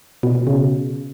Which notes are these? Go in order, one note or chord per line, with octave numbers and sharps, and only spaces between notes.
B2
B2
C#3